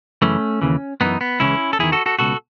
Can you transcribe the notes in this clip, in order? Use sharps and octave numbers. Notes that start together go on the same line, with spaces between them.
F#2 C#3 E3 A3 C#4
D#2 C#3 E3
F#2 E3 B3 D#4
B3
C#2 C#3 E3 C#4 E4
A4
E2 D#3 E4 G#4
F#4 A4
F#4 A4
C#2 B2 F#4 A4